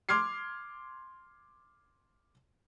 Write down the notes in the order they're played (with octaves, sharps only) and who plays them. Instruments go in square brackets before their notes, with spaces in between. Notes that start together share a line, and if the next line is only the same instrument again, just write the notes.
[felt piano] C6 D6 F6 G#6 C7